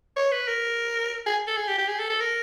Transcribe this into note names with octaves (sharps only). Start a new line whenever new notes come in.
C#5
B4
A#4
G#4
A4
G#4
G4
G4
G#4
A4
A4
A#4